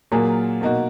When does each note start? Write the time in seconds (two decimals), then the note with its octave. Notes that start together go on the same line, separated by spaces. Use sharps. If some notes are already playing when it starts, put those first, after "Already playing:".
0.12 A#2 F#3 A#3 F4 G#4
0.61 B2 A#3 D#4 F#4